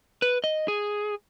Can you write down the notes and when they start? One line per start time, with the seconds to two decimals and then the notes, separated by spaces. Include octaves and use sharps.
0.22 B4
0.44 D#5
0.68 G#4